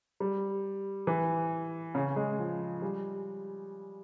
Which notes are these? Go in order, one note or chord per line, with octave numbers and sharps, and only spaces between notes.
G3
E3
C#3
G#3
F3
G3